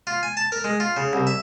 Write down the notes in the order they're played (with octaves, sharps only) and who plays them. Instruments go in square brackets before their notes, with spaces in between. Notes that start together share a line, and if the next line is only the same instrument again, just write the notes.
[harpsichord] F4
G#5
A5
A#4
G#3
F4
C#3
C2
E5